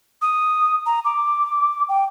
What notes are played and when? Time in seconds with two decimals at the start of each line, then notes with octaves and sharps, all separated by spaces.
0.22 D#6
0.86 A#5
1.04 D6
1.89 G5